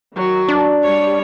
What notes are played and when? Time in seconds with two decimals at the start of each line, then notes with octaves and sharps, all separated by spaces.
0.14 D#3 F#3
0.48 D4
0.83 G3 C#5